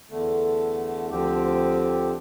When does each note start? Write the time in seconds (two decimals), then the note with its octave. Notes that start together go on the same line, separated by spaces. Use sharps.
0.10 E2 D3 A3
1.10 D2 D3 F3 C4 G4